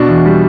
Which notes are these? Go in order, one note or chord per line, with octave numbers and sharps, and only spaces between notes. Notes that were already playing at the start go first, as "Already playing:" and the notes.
Already playing: B2 D4 F#4
E2
G3